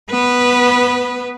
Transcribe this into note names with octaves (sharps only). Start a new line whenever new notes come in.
B3 B4